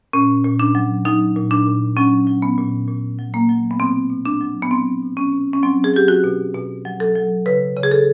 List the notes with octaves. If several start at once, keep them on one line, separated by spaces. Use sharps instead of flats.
A#2 C#4
A#2
D4
F#3
F#3 D#4
A#2
D4
A#2
F#3 C#4
F#3
B3
A#2
A#2
F#3
A#3
F#3
B3
B2 C4
B2
D4
F#3
B3
F#3 C4
B2
C#4
B2
C#4
F#3 C4
G#4
F#3 G4
F#4
B2
B2
F#3
A4
F#3
C#3 B4
C#3
G#4
A4